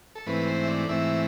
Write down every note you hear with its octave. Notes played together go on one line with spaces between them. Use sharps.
A4
G#2 E3 A3 C4 B4
C5
E5
D5
G#2 E3 A3 C4 E5